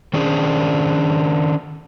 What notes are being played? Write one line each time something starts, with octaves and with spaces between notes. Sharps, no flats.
D#3 C#4 D4 G#4 C5